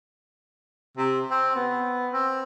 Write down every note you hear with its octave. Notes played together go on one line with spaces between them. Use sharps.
C3
C4
B3
C4